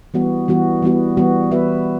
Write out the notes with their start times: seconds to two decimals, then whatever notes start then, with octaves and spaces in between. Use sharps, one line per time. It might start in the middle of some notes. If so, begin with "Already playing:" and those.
0.14 E3 G3 B3 F#4
0.48 E3 G3 B3 F#4
0.82 E3 G3 B3 F#4
1.17 E3 G3 B3 F#4
1.51 B3 F#4 B4 E5